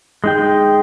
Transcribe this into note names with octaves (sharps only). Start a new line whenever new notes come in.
G#3 D#4 G5